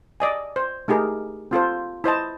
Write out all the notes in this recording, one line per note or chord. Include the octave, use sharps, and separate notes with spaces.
D5 D#5 G#5
C5
A3 D#4 G4 G#4 A#4
C4 F4 A4 C5
E4 C5 D#5 A5